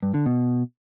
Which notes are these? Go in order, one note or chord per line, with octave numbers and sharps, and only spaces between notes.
G2
D3
B2